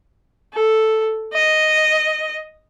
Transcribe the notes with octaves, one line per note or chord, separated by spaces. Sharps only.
A4
D#5